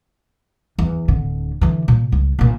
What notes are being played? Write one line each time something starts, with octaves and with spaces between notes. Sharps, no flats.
E2
D1 D3
D3 E3
A#2
C#2
A#1 A#2